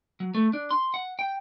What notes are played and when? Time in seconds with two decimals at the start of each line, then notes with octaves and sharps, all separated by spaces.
0.20 F#3
0.35 A3
0.53 D4
0.71 C6
0.94 F#5
1.19 G5